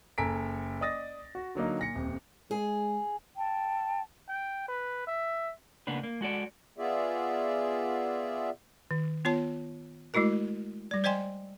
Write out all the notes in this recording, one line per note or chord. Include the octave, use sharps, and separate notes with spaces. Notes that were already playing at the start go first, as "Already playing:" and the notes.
F#1 A4 G#5 A#5 B6 D7
D5 D#5 D#6 A6 A#6
F#4
D3 F#3 A#3 D#4
A#2 A#6 C#7
D#1 F2
G#3 G#4
G5 A5
G5
B4
E5
C#3 A#3 B3 D4 B4
A#3
G#3 F#4 A4 D5
B3 F4 G#4 D5 E5
D#3
B3 F4 C#5 A5
G#3 A3 E4 F#4 A#4
G3 D5
C5 D5 D#5 G5 G#5 C6